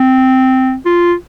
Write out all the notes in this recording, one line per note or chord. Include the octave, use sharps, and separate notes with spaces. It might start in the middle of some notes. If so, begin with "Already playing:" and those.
Already playing: C4
F4